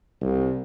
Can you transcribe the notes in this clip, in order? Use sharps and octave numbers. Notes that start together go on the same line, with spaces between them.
C2